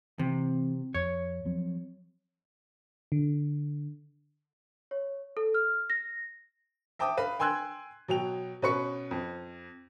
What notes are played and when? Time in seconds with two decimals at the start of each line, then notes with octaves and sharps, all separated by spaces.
0.19 C3 E3 C4
0.94 F2 C#5
1.45 F3 F#3 C4
3.12 D3
4.91 C#5
5.37 A4
5.54 F6
5.90 A#6
6.99 E5 G5 A5 D6 D#6
7.17 B4 F5
7.39 G5 G#5 C6 E6 F#6 G#6
8.08 B2 F#3 G5 F7
8.62 B2 C#4 B4 C#6 C#7
9.11 F2